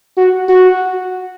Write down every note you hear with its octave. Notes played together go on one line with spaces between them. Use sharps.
F#4
F#4